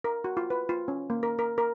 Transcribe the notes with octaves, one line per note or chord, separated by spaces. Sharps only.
A#4
F#4
F4
B4
F4
C#4
A#3
A#4
A#4
A#4